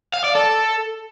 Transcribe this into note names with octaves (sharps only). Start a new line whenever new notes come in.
F5
D5
A4